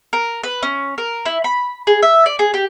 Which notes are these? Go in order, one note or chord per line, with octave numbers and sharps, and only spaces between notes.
A#4
B4
C#4
A#4
E4
B5
G#4
E5
D5
G#4
G4